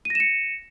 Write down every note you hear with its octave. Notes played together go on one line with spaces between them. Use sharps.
A#6 C#7 D#7 E7